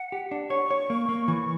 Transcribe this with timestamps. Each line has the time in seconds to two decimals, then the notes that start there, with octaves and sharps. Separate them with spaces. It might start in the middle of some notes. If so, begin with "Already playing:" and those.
Already playing: F#5
0.12 G4
0.31 D4
0.50 C#5 C#6
0.71 C#5
0.90 A#3
1.09 A#3
1.28 E3